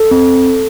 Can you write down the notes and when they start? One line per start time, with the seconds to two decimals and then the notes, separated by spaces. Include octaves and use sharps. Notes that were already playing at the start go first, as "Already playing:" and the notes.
Already playing: A4
0.11 C4